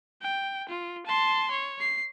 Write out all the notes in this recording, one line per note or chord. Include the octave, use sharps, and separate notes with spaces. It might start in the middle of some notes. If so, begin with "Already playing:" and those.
G5
F4
A5 C6
C#5
C7